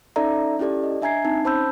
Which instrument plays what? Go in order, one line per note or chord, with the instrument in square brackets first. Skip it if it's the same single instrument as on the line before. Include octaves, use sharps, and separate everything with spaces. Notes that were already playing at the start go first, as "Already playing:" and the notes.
[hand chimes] C#4 D#4 A4 D5 E5 A#5
C#4 E4 G4 A4 D5
D#5
D4 E5 G#5 A#5 G#6 C7
C4 D#4 A5
C#4 C5 A5 B5 E6 G6